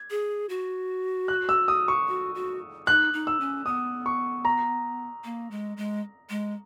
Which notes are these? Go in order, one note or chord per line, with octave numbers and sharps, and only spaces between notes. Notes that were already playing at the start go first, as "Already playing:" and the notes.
Already playing: G#6
G#4
F#4
F#6
E6
D#6
C#6
F#4
F#4
D#4 F#6
D#4
E6
C#4
B3 D#6
C#6
A#5
A#3
G#3
G#3
G#3